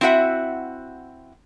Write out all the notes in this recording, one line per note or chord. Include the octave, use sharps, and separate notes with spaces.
C4 E4 F#4 E5 F#5